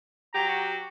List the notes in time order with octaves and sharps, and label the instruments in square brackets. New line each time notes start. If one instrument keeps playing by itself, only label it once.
[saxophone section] F#3 G4 [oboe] A#5
[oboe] F#4